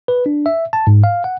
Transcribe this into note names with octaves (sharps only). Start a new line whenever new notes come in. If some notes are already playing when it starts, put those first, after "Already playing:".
B4
D4
E5
A5
G#2
F5
F#5